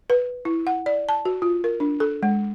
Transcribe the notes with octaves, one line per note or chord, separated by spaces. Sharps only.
B4
E4
F#5
D5
A5
F#4
F4
A#4
D4
A4
G#3